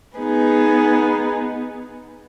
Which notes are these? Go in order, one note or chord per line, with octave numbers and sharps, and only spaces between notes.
B3 D#4 G#4 B4